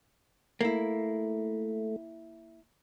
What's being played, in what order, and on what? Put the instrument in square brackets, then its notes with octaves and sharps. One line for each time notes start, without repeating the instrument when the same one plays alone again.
[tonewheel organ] A3 [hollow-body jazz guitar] A#3 E4